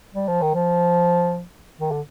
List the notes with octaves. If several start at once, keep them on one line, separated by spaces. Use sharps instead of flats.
G3
F3
D#3
F3
D#3
D3